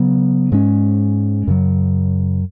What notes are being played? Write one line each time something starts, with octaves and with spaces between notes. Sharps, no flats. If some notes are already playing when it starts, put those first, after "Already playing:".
Already playing: C#3 F#3 B3
G#2 G#3 C#4
F#2 C#3 F#3